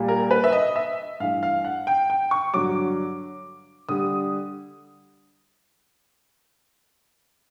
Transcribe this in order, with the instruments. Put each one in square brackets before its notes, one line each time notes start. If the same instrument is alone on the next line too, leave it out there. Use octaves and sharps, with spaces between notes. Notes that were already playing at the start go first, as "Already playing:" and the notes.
Already playing: [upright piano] A#2 G3 A#3
A#4
B4
E5
D#5
E5
G2 E3 A3 F5
F5
F#5
G5
G5
C#6
G2 D3 F#3 D6
D3 G3 D#6